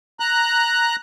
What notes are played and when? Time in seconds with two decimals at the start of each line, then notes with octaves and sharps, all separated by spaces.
0.20 A#5 F#6